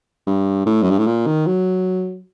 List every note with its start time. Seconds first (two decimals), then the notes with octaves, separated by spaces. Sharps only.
0.27 G2
0.66 A2
0.82 F#2
0.90 G2
0.99 A2
1.07 A#2
1.27 D#3
1.47 F#3